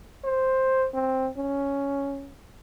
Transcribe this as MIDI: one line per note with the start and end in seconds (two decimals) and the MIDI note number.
0.24 0.87 72
0.94 1.30 60
1.37 2.32 61